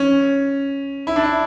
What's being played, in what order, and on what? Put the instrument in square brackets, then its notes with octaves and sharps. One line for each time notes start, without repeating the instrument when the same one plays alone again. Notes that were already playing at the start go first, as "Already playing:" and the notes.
Already playing: [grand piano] C#4
E4
D4
E4